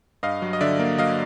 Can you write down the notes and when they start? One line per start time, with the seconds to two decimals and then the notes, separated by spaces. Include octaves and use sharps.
0.23 G2 D#5 F5
0.42 F#3
0.53 D#5
0.61 D3 D5 E5
0.79 A#3
0.98 F#3 D#5 F5